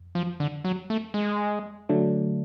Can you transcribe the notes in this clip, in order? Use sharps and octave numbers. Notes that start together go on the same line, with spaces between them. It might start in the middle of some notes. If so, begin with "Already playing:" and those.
Already playing: F2
F3
D3
F#3
A3
G#3
D3 F#3 A3 D4